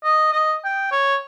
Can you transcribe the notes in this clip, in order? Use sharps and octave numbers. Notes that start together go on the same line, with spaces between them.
D#5
D#5
G5
C#5